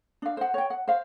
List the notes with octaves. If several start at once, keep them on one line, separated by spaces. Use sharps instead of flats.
D4 F5
C5 F#5
C#5 G5
F#5
C5 F5